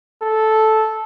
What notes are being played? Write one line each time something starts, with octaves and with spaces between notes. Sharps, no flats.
A4